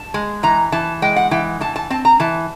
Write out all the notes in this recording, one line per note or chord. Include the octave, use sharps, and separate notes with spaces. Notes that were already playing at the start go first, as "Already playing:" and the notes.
Already playing: A5
G#3
E3 A#5
E3 A5
G#3 G5
F#5
E3 G5
E3 A5
A5
C4 A5
A#5
E3 A5